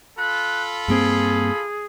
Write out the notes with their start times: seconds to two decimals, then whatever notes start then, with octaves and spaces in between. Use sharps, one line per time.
0.18 F4 A4 B5 F#6
0.88 G2 A#3 C4 G#4